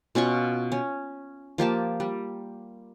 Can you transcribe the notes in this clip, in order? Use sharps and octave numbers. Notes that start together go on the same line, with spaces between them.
B2 C#4 F4 C#6
C#4
F3 A#3 G4 A5
G3